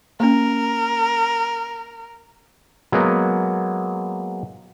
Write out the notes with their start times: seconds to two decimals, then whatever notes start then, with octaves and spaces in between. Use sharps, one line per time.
0.20 A#3 C#4 A#4
2.92 F#3 G#3 A#3 B3